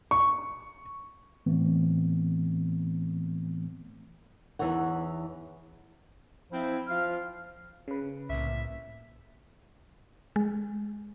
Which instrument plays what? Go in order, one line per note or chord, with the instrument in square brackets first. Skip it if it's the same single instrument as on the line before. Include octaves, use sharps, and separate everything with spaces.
[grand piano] C#6
[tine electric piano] A2 E3 A3 B3 C4
[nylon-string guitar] E2 E3 D#4 C#5 F#5
[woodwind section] F3 C4 E4
F3 F4 F5 F6
[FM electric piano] C#3 B4
[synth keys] C2 A2 A#3 [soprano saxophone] E5
[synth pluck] G#3